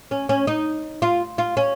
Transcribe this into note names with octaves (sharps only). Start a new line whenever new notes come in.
C#4
C#4
D#4
F4
F4
C#4